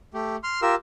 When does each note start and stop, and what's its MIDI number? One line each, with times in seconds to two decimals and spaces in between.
0.14 0.36 57
0.14 0.36 67
0.43 0.61 84
0.43 0.61 89
0.62 0.75 65
0.62 0.75 67
0.62 0.75 70
0.62 0.75 88